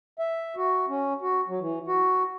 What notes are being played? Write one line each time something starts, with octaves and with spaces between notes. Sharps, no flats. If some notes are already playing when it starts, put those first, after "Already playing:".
E5
F#4
C#4
F#4
F#3
E3
F#4